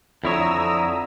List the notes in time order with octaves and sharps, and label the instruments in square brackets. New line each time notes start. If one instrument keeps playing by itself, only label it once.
[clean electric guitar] F2 E4 C#5 [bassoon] D3 [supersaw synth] A#5 D#6 E6